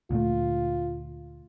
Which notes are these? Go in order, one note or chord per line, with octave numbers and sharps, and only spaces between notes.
D2 A#2 A3 F4